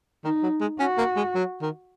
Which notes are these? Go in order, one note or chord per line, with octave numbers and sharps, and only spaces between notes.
D#3 D#4
F#3
G#3
C#4 F#4
A#3
G#3
F#3
D#3